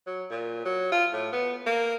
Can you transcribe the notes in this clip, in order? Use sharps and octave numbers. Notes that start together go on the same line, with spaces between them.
F#3
A#2
F#3
F4
A2
B3
A#3